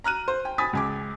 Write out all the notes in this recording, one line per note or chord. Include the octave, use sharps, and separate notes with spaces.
A#5 F6 F#6 D#7
C5
G5
G#5 B5 D#6 A6 B6
C#2 G#5 D6